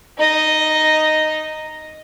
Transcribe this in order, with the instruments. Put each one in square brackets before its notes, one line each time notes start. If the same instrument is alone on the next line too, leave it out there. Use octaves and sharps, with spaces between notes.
[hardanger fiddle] D#4 D#5